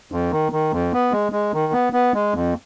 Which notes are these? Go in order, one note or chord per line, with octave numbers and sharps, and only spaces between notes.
F2
D#3
D#3
F2
B3
G#3
G#3
D#3
B3
B3
G#3
F2